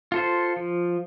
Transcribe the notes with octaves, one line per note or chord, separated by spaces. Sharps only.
F4 A4 C5
F3